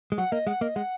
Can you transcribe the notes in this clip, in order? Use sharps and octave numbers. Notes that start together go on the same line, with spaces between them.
G#3
F#3 F#5
A#3 D#5
G#3 F#5
A#3 D#5
G#3 F#5